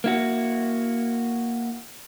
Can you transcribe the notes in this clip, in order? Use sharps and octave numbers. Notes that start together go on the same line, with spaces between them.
A#3 E4 F#4